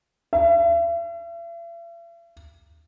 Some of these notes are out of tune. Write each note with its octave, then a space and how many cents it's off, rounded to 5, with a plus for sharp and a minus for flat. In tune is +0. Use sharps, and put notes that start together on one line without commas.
E5 +45